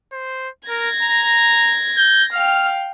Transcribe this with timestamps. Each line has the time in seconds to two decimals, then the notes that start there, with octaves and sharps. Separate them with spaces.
0.13 C5
0.69 A#4 G#6 A#6
1.03 A#5
1.97 G6
2.33 F5 G5 F6